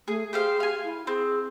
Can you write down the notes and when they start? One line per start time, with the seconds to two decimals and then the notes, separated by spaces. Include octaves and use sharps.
0.08 A3 G#4
0.33 G4 G#4 C5 F5
0.60 F5 G#5
0.84 E4
1.07 C4 G#4